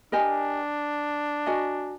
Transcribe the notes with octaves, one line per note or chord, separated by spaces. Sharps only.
D4 G4 A#4 D#5 G#5
F#4 A#4 D#5 G#5